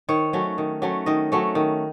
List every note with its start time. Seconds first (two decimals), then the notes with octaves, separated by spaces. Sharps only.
0.09 D#3 C#5
0.33 F#3 A3 C#4
0.58 D#3
0.82 F#3 A3 C#4
1.06 D#3 D#5
1.32 F#3 A3 C#4
1.55 D#3